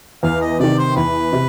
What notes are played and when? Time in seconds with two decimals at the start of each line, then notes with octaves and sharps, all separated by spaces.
0.23 E2 F5
0.41 D#5
0.60 C3 D#3 D5
0.78 C5
0.96 E2 B4
1.33 C3